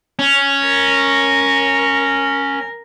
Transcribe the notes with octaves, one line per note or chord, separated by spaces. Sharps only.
C#4
A#4